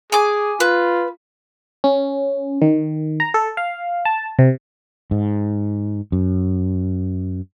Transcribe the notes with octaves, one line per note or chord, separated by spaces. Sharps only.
G#4 G#5 D6
F4 B4
C#4
D#3
A#5
A4
F5
A5
C3
G#2
F#2